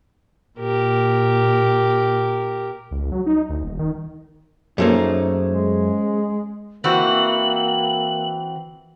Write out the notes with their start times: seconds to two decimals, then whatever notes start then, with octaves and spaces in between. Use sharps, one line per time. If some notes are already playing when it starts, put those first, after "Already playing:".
0.59 A#2 G4 A#4
2.91 C#2
3.12 F#3
3.26 D#4
3.49 D2
3.64 D#1
3.79 D#3
4.78 F#2 A3 A#3 C#4 D#4 G#4 C5
5.52 G#3
6.84 E3 A#3 C4 F#4 F#7